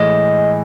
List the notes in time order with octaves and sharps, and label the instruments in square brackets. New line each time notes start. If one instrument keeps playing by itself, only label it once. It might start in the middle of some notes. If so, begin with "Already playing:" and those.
Already playing: [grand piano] A2 E3 G#3 [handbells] D#5